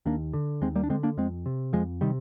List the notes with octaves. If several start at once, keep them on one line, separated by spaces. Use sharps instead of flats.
D#2 A#3 D4
D3
D#2 G#3 C4
G3 A#3
D4
D3 G#3 C4
A#3 D4
F2 G#3 C4
C3
F2 F3 G#3
C3 D#3 G3